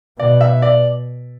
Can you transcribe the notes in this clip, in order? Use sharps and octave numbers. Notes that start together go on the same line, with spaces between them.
B2 D5
E5
D5